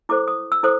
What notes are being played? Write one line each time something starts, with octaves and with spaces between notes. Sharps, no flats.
E4 A4 C5 D6
D#6
E6
E4 A4 C5 D#6